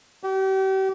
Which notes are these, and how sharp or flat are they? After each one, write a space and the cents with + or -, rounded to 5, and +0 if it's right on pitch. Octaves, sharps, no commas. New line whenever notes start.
G4 -40